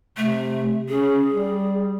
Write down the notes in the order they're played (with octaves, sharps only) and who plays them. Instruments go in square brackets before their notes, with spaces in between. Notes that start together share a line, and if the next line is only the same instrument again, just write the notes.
[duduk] C3 [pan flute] A3
[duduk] C#4 [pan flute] G#4
[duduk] G3